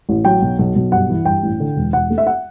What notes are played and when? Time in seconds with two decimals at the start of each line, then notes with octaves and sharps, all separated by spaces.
0.09 A1
0.25 F#3 G5
0.42 B1
0.59 B1
0.76 B1
0.92 G2 F#5
1.09 E3
1.25 G2 G5
1.43 A1
1.60 D3
1.76 E1
1.93 E1 F#5
2.10 A3
2.18 E5
2.27 F#5